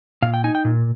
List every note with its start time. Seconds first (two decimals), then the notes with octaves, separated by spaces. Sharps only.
0.22 A#2 F5
0.34 G5
0.44 D#4 G#5
0.55 G5
0.65 A#2